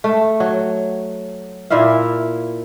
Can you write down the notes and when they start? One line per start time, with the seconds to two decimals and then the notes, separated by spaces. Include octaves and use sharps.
0.04 A3
0.40 F#3
1.70 A#2 E4 E5 F5